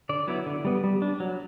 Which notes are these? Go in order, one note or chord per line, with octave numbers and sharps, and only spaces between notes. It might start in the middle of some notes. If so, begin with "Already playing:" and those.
D3 D5
F#3 B3 E4
D3
G3 B3
G3
D4
F#3